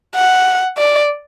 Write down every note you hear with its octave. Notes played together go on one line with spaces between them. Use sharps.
F#5
D5